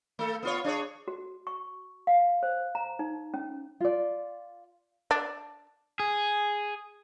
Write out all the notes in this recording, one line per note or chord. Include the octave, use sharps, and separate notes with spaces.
A3 A4
B3 F4 C#5
D4 G#4 C#5
F#4
C#6
F5
C5
A#5
D#4
C#4
F4 D5
D4
G#4